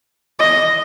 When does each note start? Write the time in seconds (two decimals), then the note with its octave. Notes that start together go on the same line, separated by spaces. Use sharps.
0.39 D#5